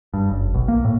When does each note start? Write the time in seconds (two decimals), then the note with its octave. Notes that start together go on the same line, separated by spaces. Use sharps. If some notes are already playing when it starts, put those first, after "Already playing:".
0.14 G2
0.30 F#1
0.54 B1
0.68 A#3
0.85 A2